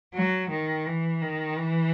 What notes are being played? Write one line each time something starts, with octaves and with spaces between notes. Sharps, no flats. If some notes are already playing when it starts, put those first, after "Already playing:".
F#3
D#3
E3
D#3
E3